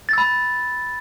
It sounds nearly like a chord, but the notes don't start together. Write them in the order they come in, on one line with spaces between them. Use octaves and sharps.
A6 E6 B5